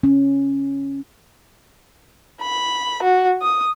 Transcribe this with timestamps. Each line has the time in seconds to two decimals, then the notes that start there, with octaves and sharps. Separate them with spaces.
0.03 C#4
2.42 B5
3.03 F#4
3.42 D#6